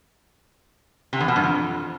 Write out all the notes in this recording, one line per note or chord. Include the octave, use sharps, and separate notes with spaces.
C3
E2
B2
G2
F2